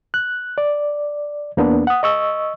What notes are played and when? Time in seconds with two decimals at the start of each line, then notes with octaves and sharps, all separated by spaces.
0.14 F#6
0.58 D5
1.57 E2 A#3 B3 D4
1.87 F#5 D#6
2.03 D#5 C#6 E6